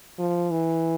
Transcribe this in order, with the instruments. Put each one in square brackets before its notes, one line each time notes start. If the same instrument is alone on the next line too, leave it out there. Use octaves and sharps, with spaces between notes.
[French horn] F3
E3